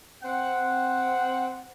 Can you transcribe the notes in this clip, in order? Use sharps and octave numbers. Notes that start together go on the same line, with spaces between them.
C4 F#5